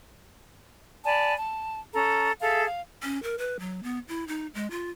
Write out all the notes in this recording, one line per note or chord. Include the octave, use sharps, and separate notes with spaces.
D5 G#5 A5 B5
A5
C#4 A4 A#5
G#4 A4 E5 F5
F5
C#4
A#4
B4
F#3
B3
E4
D#4
G#3
F4